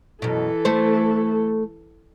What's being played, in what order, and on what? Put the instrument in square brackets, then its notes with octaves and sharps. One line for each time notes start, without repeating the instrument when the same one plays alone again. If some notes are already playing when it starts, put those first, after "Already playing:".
[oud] F#2 B2 [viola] E3 A4
[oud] A3 C5